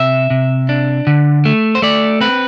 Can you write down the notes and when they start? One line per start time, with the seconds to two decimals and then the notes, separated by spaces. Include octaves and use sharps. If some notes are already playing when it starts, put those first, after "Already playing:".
Already playing: C3 E5
0.30 C3
0.69 D4
1.07 D3
1.45 A3
1.75 C5
1.82 A3 D5
2.21 C4 B4